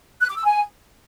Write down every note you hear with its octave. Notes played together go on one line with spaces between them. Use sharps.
F#6
D6
E6
G#5